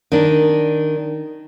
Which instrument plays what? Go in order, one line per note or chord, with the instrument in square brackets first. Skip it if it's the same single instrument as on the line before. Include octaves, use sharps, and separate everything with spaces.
[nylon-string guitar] D#3 D4